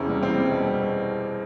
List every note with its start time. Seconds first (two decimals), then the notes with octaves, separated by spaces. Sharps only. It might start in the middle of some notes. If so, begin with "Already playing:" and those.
Already playing: E1 E2 C3 C#4
0.09 G3
0.22 E2 C4
0.37 G3
0.52 B2